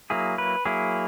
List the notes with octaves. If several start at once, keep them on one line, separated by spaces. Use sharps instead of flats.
F#3 A#3 E4 G#4
B4
F#3 A#3 E4 G#4